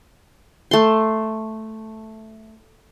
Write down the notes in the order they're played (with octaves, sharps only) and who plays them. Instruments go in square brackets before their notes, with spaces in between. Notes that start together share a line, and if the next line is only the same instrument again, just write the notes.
[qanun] A3 C6